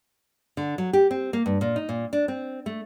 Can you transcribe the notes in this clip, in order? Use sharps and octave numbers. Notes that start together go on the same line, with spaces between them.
D3
F#3
G4
C4
A#3
G2
A#2
D#4
A#2
D4
C4
A3